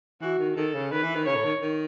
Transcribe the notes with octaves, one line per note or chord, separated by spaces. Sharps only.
E3 F#4
D#3
D#3 A4
C#3
D#3 B4
E3
D#3
C#3 C#5
A2
D#3
D#3